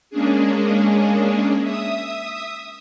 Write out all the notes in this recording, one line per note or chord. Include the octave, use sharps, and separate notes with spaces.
G#3 A#3 C#4 D4 G#4
E5 D#6